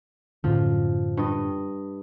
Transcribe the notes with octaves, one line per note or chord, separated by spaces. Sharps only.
F#2 A2 D3 F3
G2 D#5